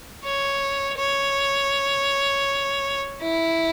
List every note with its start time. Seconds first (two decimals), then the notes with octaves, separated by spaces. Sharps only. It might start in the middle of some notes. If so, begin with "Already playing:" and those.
0.24 C#5
0.98 C#5
3.22 E4